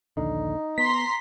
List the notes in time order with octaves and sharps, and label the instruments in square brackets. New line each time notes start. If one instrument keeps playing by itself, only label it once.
[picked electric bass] A#1 D#2 D3 [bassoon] D#4
[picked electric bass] B3 [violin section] A#5 C6 [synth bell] B6